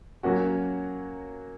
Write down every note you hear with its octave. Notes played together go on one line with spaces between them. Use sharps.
F#3 A#3 C#4 F#4